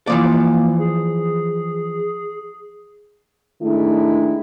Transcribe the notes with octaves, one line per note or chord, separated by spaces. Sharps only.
E3 F3 A#3 D5
G#4
D#3 G#3 A3 D4 E4